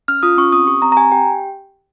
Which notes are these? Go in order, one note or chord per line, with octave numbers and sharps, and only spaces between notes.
C#4 F6
F4 D#6
C#4 C#6
C4 D#6
G4 C#6
C4 A#5
A#5
G4 G#5
G4 G5